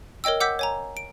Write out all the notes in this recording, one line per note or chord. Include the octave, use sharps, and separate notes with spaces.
A#4 C#5 D#5 G5 E6
F#5 D6 E6 G6 B6
C#5 G#5 A#5
D7